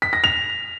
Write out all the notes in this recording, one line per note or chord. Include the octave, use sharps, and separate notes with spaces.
B6
A#6
F7